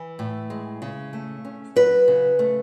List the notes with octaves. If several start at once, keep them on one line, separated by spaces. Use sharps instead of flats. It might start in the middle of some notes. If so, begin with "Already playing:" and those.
Already playing: E3
A2
G#3
C#3
A3
C#4
F#3 B4
C#3
A3